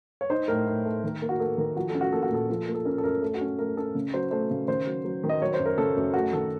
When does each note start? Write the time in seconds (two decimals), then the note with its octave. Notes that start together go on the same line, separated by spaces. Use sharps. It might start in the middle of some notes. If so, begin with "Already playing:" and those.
0.21 C#5
0.30 D#4 C5
0.48 A2 A#4
0.66 A2
0.85 A3
1.04 D#3
1.22 A#3
1.29 F#4
1.40 A#3 A4
1.58 D#3
1.76 F3 F#4
1.89 A4
1.95 C#4
2.01 F#4
2.13 A#3 A4
2.23 F#4
2.30 A#2 A4
2.50 F3
2.68 A#3
2.74 A4
2.85 C#4 A#4
2.98 A4
3.04 F#2 A#4
3.22 A3 A4
3.34 F#4
3.41 C#4
3.59 A3 A#4
3.77 C#4 A4
3.95 C#3
4.14 F#3 C5
4.31 A3 C5
4.51 C#3
4.68 D#3 C5
4.87 F#3
5.05 F#3
5.24 D#3
5.29 D#5
5.42 F#3 C#5
5.54 C5
5.59 F#2
5.66 A#4
5.78 C#3 A4
5.97 F#2
6.14 A3 F#4
6.33 D#3 A4